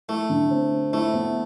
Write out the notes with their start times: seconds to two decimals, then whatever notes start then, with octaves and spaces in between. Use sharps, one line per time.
0.08 A3 E4
0.30 D3
0.51 C4
0.71 C4
0.93 A3 E4
1.14 B3